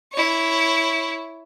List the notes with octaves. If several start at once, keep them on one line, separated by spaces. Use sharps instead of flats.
E4 C#5